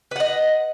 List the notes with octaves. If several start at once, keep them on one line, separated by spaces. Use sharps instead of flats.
B4 D#5 F#5